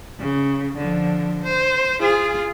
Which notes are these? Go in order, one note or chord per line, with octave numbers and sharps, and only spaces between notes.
C#3
D3 F3
C5
F4 G#4